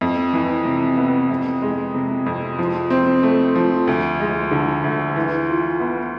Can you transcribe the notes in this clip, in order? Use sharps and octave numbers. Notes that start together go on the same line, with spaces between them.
F2
E3
C3
B3
F2
G#3
C3
F2
F3
C4
A3
F3
D2
G#3
D3
D2
E3
F4
B3